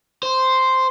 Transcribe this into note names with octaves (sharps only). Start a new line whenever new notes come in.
C5